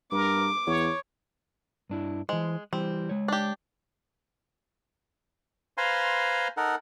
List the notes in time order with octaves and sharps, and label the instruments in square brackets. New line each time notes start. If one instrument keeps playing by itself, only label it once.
[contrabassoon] G2 [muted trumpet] A#4 [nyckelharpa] D6
[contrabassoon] E2 [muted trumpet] C#5
[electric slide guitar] G2 D4 E4
[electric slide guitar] E3 C5 [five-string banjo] G#3
[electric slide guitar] E3 G3 [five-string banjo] C4
[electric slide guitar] G#3 C#5
[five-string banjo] D4 G4
[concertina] B4 C5 F5 G#5 A#5 C6
D#4 A4 A#4 F#5